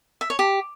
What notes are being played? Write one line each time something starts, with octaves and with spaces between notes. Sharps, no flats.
E5
C#5
G4